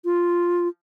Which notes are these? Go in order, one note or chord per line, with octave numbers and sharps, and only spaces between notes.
F4